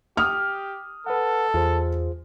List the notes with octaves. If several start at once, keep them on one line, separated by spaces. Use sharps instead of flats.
G4 D#6 F6
A4 B4 F#5
E2 F4 G#4 C5